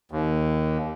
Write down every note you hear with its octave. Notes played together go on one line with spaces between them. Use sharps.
D#2